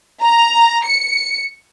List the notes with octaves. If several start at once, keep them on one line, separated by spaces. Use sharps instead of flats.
A#5
C#7